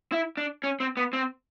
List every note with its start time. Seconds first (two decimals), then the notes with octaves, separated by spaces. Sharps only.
0.12 E4
0.37 D4
0.64 C#4
0.80 C4
0.97 B3
1.13 C4